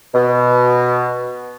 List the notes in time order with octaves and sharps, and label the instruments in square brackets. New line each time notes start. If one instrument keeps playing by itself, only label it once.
[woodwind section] B2